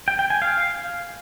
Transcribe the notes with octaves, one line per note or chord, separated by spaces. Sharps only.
G5
G5
G#5
F5